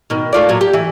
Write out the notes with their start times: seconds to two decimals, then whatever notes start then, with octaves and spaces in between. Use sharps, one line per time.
0.10 B2 D#3
0.33 A3 F4 D5
0.49 A#2 F#3
0.61 G4
0.74 E3